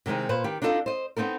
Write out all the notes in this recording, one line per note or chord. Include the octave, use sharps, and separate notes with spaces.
C3 D#3 G#3 C4 D#4
A#2 B4 C5
D#3 G4
D4 D#4 F4 A4 D#5
C5 D#5
B3 C4 D#4 A4 A#4